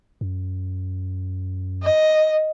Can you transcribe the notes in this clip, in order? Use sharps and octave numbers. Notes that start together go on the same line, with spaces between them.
F#2
D#5